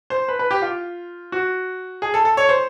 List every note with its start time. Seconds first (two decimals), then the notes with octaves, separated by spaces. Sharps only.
0.10 C5
0.28 B4
0.39 B4
0.51 G4
0.62 F4
1.32 F#4
2.02 G#4
2.14 A4
2.25 A4
2.37 C#5
2.49 C5